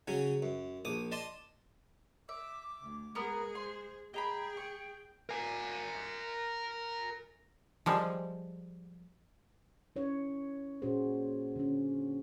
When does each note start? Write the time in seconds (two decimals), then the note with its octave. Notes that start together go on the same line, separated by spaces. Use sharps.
0.08 C#3 F#3 C#4
0.42 F#2
0.85 A#1 D6 D#6
1.12 D5 D#5 A5 C6
2.29 E5 D6
2.82 D2
3.15 G#3 B3 G#4 A#4 D#6
3.55 C5 C6
4.14 G#4 D#5 G5 A#5 B5
4.57 C#6
5.29 A#4 G#5
7.86 F3 G3 G#3
9.96 C#4 E4 C#5
10.82 A#2 C#4 F#4 G#4 C5
11.56 D3 C#4